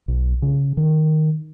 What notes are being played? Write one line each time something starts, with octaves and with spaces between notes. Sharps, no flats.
B1
C#3
D#3